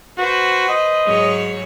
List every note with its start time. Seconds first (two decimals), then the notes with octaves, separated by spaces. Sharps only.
0.18 F#4 B4 C5
0.69 D#5
1.05 G#2 F#3 C#5